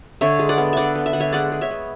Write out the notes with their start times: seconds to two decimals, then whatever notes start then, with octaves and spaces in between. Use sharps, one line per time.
0.21 D3 C#5 E5
0.39 G#3
0.49 D5 F#5
0.58 B3
0.73 D3 D5 E5 F#5
0.95 B3
1.06 E5
1.13 D3 F#5
1.20 C#5 E5
1.33 G#3 D5 F#5
1.52 G#3
1.61 C#5 E5
1.71 B3